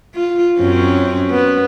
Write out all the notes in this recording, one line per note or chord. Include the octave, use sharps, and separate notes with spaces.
F4
F#2 C4 C#4
B3